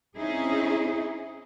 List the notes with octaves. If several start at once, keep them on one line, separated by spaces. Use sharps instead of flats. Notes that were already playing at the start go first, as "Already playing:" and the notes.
C4 C#4 D#4 E4 G#4